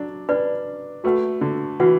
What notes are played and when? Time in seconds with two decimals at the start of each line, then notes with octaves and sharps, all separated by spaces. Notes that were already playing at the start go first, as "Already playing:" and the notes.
Already playing: F#3 D4
0.29 D4 B4 D5 B5
1.04 A3 F#4 B4 F#5
1.41 D3
1.80 E3 F#4 B4 F#5